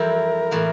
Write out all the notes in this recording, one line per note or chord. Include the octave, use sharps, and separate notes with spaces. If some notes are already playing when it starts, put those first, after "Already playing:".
Already playing: F2 E3 G3 C4 E4 A#4
A2 E3 A#3 F4